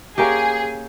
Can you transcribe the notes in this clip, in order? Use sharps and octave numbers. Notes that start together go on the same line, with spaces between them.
A#3 C#4 G4 G#4